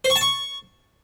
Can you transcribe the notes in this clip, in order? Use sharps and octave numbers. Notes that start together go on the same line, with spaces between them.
C5
C#6
A5
C#6